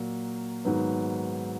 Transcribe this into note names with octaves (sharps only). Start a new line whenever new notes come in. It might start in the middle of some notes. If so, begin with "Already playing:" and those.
Already playing: A#2 F#3 A#3
G#2 D#3 F#3 B3